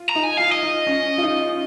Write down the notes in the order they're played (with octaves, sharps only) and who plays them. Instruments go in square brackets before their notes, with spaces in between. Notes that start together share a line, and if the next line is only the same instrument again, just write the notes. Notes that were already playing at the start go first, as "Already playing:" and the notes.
Already playing: [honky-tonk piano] F4
[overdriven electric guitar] A#5
[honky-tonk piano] D#4
[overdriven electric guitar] G#5
[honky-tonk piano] F4 [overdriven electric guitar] F5
[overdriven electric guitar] D#5
[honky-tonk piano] D#4
C#4
F4
D#4